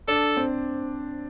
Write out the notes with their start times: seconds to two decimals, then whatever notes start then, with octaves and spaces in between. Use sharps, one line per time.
0.08 D4 A4
0.37 C4